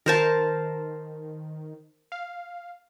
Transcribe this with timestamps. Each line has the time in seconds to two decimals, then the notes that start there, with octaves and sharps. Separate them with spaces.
0.06 D#3 A#4 C5 A5
2.12 F5